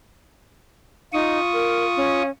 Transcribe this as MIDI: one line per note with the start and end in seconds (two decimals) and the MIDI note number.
1.13 1.39 63
1.13 2.22 65
1.13 2.22 85
1.13 2.22 87
1.54 1.86 70
1.97 2.30 61